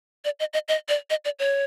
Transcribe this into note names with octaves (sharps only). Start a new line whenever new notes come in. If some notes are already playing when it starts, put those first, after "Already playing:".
D5
D#5
D#5
D#5
D5
D#5
D5
C#5